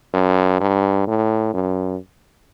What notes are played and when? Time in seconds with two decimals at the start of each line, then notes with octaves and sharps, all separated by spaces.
0.14 F#2
0.60 G2
1.07 A2
1.54 F#2